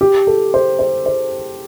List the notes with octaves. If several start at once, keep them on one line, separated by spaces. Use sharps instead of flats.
G4
A4
C5
C5
C5